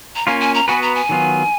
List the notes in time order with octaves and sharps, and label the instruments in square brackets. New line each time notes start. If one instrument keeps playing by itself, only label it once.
[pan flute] A#5
[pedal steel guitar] A#3 C#4 F4 [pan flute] G#5
[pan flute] G#5
A#5
[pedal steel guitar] B3 F#4 B4 [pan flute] G#5
[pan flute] A#5
G#5
[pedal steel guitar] D#3 F#3 B3 F4